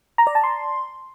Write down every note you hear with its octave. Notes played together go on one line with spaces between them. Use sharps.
A#5
D5
A5
C6